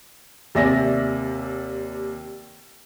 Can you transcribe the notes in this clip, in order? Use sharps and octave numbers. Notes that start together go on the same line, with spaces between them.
D#2 C3 D5 E5 G#5 A#6